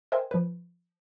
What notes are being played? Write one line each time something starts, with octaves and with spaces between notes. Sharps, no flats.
A#4 C5 D#5 E5 G5 G#5
F3 B4